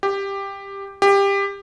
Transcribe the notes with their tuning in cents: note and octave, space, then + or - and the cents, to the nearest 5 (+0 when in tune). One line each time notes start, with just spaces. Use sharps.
G4 +10
G4 +20